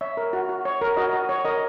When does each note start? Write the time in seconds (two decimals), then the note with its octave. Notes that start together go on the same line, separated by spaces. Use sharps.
0.01 C#5 E5
0.17 A#4
0.33 F#4
0.49 F#4
0.65 C#5
0.82 A#4
0.97 F#4 D#5
1.13 F#4
1.29 C#5
1.45 A#4 D#5